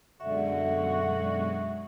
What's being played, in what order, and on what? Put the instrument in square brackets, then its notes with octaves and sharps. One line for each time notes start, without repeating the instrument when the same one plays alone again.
[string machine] F#2 B2 G#3 [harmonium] D3 [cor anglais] F#4 [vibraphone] E5